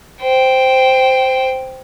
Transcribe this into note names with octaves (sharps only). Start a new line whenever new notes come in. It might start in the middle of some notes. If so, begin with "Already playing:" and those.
C5 G5